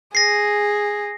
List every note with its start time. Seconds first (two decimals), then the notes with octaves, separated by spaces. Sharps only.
0.15 G#4 A#6 C7